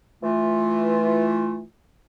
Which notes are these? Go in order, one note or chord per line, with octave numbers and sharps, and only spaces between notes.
E3 A3 F4